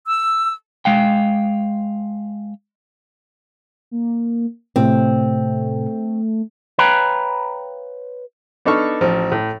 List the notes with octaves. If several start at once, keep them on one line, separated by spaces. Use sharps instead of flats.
E6
G#3 F5 G5
A#3
A2 C3 A3 C4
B4 C#5 F5 G5 A#5 B5
B3 D4 D#4 A4 C#6 F6
A1 F3
A2